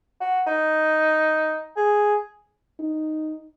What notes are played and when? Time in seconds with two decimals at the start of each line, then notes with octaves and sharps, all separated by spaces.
0.20 F#4
0.46 D#4
1.76 G#4
2.80 D#4